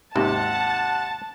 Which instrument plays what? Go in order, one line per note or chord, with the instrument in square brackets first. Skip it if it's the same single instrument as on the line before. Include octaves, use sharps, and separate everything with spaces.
[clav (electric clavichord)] G#1 D#2 [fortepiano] C3 [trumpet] F#5 [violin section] A5